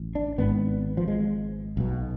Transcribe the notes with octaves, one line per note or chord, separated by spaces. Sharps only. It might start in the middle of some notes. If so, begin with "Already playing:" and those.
Already playing: A1
D4
G#1 G#2 B3
F3
G#3
B1 B2